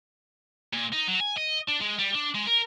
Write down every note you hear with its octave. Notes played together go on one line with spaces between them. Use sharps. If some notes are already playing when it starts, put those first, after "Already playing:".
A#2
D#4
F#3
G#5
D#5
D4
G#3
G3
D4
G#3
A#4